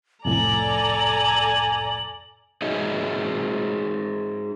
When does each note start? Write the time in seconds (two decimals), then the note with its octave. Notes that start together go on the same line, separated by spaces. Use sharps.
0.25 C2 F2 A2 A4 D5 G#5 A#5 F#7
2.62 D#4 F#4 G#4 C#5 D#5 E5